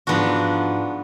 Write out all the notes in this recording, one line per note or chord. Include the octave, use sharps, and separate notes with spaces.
G#2 F3 B3 D4 F#4